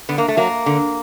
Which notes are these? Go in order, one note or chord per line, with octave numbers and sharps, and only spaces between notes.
D3 B3
A#3
A3
F#3 A#3
D3